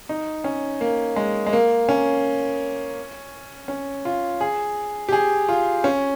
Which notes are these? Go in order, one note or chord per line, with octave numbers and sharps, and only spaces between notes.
D#4
C#4
A#3
G#3
G#3
A#3
C#4
C#4
F4
G#4
G4
G#4
F4
C#4